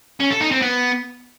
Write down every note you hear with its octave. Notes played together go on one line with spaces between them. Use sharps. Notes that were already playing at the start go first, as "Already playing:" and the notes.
C#4
A4
D#4
C4
B3